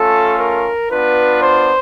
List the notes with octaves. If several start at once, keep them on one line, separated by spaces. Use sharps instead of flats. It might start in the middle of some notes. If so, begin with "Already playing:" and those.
Already playing: A3 C#4 F4 A4
A#4
B3 D4 F4 B4
C5